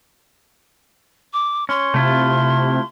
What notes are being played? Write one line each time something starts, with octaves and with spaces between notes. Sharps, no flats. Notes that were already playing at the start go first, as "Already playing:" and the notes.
D6
C#4 C6
C3 A3 E4 F4